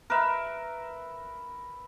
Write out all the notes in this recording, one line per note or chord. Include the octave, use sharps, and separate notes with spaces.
A#4 B4 E5